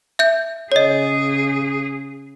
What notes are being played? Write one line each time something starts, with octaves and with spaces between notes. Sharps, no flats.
E5 G6
C#3 G#4 C#5 D#5